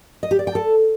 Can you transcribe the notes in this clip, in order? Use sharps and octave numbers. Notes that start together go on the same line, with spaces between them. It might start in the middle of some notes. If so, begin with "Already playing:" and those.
D#5
G4
D5
G5
A4